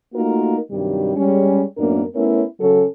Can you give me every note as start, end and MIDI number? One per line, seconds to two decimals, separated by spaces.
0.14 0.56 57
0.14 0.56 58
0.14 0.56 63
0.14 0.56 65
0.14 0.56 66
0.14 0.56 70
0.71 1.15 43
0.71 1.15 48
0.71 1.15 51
0.71 1.15 54
0.71 1.15 55
1.16 1.63 55
1.16 1.63 56
1.16 1.63 61
1.78 2.03 42
1.78 2.03 45
1.78 2.03 58
1.78 2.03 59
1.78 2.03 62
1.78 2.03 70
2.15 2.42 57
2.15 2.42 59
2.15 2.42 61
2.15 2.42 64
2.15 2.42 70
2.15 2.42 73
2.60 2.84 49
2.60 2.84 54
2.60 2.84 61
2.60 2.84 69